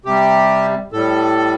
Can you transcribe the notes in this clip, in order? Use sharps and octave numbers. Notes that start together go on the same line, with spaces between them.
C3 G3 G4
A2 G3 A4